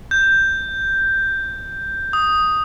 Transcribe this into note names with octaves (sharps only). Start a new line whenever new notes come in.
G6
D#6